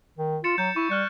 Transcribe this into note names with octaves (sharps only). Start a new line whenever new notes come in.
D#3
F4 A6 C#7 E7
F#3 G6
E4 C#6
G3 F6 F#6 C#7